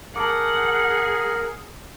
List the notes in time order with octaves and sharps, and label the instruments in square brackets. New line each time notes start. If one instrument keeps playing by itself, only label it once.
[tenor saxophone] G#4 [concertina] A#4 [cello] F#5 [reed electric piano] A5 D6